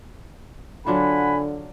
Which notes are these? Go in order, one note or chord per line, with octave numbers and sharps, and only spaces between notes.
D3 F#3 D4 F4 F#5 G#5 B5